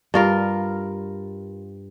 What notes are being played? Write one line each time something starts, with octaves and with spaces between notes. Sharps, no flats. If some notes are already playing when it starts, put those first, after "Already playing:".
G2 F4 A#4